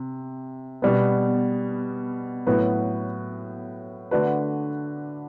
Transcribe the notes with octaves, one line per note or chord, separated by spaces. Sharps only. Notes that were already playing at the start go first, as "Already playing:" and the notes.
Already playing: C3
B2 G3 B3
A2 F#3 B3 F#4 B4
D3 A3 D4 F#4 B4